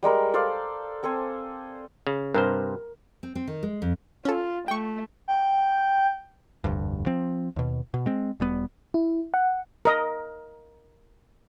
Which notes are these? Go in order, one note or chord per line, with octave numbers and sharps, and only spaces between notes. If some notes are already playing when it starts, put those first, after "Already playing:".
G3 G#3 A#4 B4
A4 C5 D5 F5
C4 A4 C5 G#5
C#3
G2 C3 A#4 C5
C4
C4
D#3
G#3
F2
C#4 F4 A4
A3 G5 C#6
G5
F1 D2 G2
F3 C4
D#2 B2
B2
G#3 C4
E1 G3 B3
E4
F#5
A#4 D#5